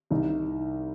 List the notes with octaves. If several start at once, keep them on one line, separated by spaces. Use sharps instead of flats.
C2 D#4